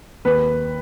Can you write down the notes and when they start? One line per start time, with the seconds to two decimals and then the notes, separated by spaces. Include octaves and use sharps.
0.25 D#2 B4